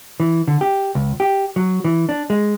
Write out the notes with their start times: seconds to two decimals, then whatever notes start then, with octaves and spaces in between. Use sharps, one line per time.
0.20 E3
0.48 D3
0.61 G4
0.95 C#2
1.20 G4
1.56 F#3
1.85 E3
2.09 D4
2.30 G#3